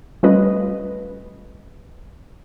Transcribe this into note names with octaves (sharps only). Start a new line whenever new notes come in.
G3 A3 C#4 F4 B4 D#5